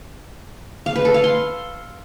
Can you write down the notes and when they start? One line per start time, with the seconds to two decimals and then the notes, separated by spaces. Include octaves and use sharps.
0.86 F5
0.96 B4
1.05 A4
1.14 F5
1.24 C6